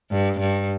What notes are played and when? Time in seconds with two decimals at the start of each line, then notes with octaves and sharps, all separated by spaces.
0.11 G2
0.40 G2